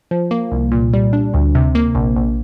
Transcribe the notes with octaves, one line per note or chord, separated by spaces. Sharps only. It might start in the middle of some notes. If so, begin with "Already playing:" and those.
F3
A#3
C2
A#2
G3
D4
D2
C3
A#3
A#1
A#1